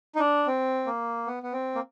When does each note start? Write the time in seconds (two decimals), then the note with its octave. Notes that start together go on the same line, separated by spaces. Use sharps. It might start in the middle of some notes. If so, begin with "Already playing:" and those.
0.15 D#4
0.19 D4
0.47 C4
0.86 A#3
1.27 B3
1.43 B3
1.53 C4
1.75 A#3